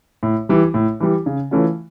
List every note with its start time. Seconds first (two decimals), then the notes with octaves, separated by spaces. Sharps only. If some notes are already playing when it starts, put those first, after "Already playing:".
0.23 A2
0.49 E3 G3
0.74 A2
1.00 E3 G3
1.26 C#3
1.51 E3 A3 C#4 F4